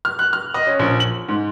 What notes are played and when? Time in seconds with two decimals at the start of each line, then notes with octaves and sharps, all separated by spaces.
0.05 F6
0.19 F#6
0.33 F6
0.54 D#5
0.67 C#4
0.79 A#1
1.00 F#7
1.28 G#2